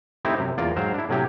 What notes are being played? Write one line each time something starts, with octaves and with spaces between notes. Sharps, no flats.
A3 C4 D#4 E4 G4
F#2 C3
E2 A#3 F4 D5
G#2 F#3 C5 F5 G5
D4 E4
A2 C3 F#3 C#4 G4